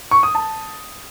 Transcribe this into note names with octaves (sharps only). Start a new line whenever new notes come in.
C#6
D#6
A5